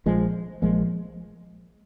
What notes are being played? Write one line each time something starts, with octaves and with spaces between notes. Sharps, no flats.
A#1 A#2 F3 G#3
A#1 A#2 F3 G#3